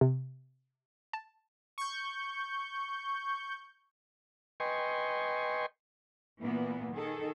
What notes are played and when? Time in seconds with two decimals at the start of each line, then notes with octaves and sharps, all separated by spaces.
0.01 C3
1.13 A5
1.78 C#6 G6
4.60 B4 D#5 G5 G#5 C6 C#6
6.40 A#2 E3 A#3 B3
6.92 D#3 G#4 A4